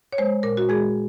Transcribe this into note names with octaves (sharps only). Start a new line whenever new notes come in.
C#5
G#3 C5
A#2 A#4
F#4
G#3 G#4